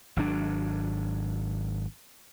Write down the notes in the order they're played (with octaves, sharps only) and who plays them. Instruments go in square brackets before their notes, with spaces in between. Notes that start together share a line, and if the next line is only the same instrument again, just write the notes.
[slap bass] G#1 F#3 D4